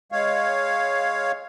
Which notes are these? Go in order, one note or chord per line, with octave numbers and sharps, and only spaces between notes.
G#3 C#5 F5